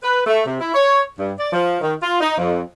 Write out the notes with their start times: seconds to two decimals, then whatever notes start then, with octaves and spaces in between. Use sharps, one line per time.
0.03 B4
0.26 A3
0.45 C3
0.60 E4
0.74 C#5
1.19 G2
1.39 D5
1.53 F3
1.81 D#3
2.01 F4
2.20 D#4
2.38 F2